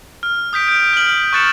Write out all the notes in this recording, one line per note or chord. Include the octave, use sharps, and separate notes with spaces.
F6
D#6 G6 B6 D7
G6 D7
F6 F#7
C#6 F#6 A6 C#7 E7